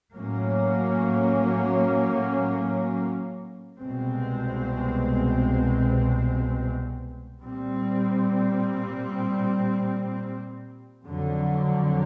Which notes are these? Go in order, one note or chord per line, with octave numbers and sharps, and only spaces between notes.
A2 F#3 A#3 C#4
C2 B2 G#3 C4
A#2 G3 C4
F2 D3 F#3